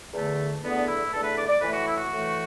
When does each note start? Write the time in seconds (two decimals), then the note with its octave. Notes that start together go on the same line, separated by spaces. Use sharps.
0.13 E2 D3 A3
0.63 E2 D3 A3 B3
0.76 D4
0.87 E4
1.12 E2 D3 A3 A4
1.23 B4
1.36 D5
1.48 D5
1.60 A2 E3 A3 B4
1.73 F#4
1.87 E4
1.97 F#4
2.10 A2 E3 A3